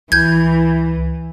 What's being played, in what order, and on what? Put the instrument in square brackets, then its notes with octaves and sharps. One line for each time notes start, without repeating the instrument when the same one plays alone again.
[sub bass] C#2 [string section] E3 [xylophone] G6 G#6